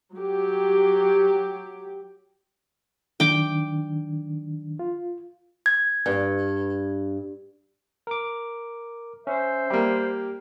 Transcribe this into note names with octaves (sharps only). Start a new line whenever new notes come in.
F#3 G4
D#3 F#3 D4 G5 D6
F4
G#6
G2
A#4 D6
C#4 C5 E5
G3 A#3 G4